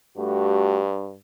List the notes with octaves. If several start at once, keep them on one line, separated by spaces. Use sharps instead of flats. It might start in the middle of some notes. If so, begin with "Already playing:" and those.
G2 A3 F#4 G4